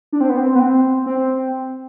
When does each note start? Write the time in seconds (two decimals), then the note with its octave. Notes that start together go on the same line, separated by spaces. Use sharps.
0.13 D4
0.21 C4
0.29 B3
0.37 C4
0.55 B3
0.60 C4
1.06 C4